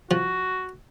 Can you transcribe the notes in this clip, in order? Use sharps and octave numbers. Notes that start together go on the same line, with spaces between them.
F3 F#4